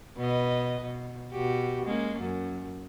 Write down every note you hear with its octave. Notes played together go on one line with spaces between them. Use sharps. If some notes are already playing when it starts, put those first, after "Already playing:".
B2 B4 D#5
B2
B2 F#4 G4
G#3 A#3 C#4
F#2